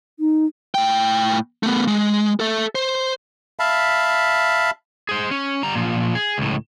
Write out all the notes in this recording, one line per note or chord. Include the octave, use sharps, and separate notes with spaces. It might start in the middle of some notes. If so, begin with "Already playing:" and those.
D#4
A2 G5
A3 B3
G#3
A4 E5
C5
E5 F5 A5 B5
G#4 C5
C#4
G3 A#5
A#2 F3
G#4
C#2 A2